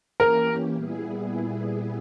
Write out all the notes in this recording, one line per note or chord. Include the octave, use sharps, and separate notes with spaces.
E3 A#3 C#4 G4 A#4
A#2 G3 B3 E4 G#4